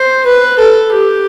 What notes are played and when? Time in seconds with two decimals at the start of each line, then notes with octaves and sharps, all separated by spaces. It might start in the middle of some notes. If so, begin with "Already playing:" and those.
Already playing: C5
0.26 B4
0.59 A4
0.92 G4